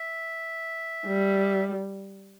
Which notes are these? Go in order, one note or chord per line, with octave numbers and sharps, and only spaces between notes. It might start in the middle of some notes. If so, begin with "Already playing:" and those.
Already playing: E5
G3